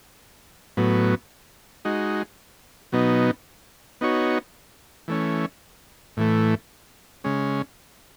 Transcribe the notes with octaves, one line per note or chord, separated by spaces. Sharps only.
A2 F#3 B3
G#3 D#4 F#4
B2 F#3 B3 D#4
B3 D#4 F#4 C#5
E3 A3 C#4
A2 E3 A3
C#3 G#3 C#4